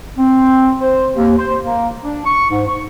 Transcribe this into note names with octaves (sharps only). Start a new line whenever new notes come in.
C4
C5
D#2
C5
A#3
D4
C#6
G#2
C#6